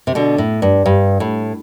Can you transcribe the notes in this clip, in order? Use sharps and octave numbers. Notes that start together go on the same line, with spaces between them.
C3
B2 D3
A2
G2
G2
A2